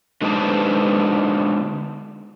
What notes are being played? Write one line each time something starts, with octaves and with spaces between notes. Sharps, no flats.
D3 G#3 D#4 B4 C5 A5